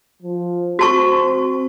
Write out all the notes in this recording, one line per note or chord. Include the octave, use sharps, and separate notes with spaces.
F3
C4 F#4 A5 C#6